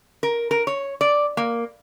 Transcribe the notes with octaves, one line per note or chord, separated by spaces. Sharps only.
A#4
A#4
C#5
D5
A#3